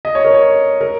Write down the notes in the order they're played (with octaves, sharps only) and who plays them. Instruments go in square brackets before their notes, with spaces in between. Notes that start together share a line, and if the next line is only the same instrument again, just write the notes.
[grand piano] D#5
C#5
A#4
C#5
A#4